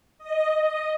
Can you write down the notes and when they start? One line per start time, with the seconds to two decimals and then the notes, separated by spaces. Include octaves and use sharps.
0.19 D#5
0.59 D#5